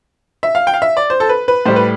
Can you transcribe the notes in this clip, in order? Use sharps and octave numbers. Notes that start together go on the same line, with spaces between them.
E5
F5
G5
F5
E5
D5
C5
A4
B4
B4
A2 G3 C5
B4